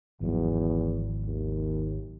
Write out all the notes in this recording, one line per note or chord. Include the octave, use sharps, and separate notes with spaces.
G#1 E2 F3 F#3
D#2